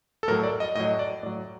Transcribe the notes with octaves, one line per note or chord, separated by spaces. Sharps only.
A4
A2 F#3 A#4
D5
D#5
A2 F#3 D#5
D5
A2 F#3 D5